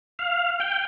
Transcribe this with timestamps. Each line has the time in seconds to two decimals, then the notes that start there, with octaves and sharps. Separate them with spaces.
0.19 F5
0.60 G5